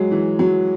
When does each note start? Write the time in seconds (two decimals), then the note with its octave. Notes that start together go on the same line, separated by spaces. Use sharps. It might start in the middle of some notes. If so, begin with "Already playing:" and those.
Already playing: F#3 G#3
0.11 E3
0.39 F#3